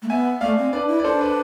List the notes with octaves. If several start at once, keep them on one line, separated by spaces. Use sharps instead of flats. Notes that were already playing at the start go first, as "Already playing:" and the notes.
A3
B3 E5 G#5
A3 D5 F5
C4
D4 B4 D5
E4
D5
D4 A4 C5
B4 D5